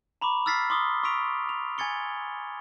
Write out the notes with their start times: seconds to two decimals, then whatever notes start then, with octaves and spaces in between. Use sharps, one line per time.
0.22 A#5 B5 C#6 D6
0.46 E6 F6 A6 B6 C7
0.70 C6 D6 D#6 G7
1.03 C#6 E6 B6 D7 F7
1.49 F7
1.78 G#5 G#6 A6 C#7 G7